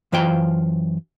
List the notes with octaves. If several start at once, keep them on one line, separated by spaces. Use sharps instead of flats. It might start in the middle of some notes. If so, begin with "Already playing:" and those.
F#2 E3 F4 C5 F5 G5